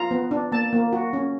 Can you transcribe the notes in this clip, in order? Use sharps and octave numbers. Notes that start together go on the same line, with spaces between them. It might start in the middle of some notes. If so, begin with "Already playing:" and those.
Already playing: F4 A#5
B3
D4
A#3 A5
A#3
F#4
C#4